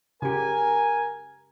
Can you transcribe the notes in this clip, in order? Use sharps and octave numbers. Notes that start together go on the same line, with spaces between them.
C#3 G4 A#4 G#5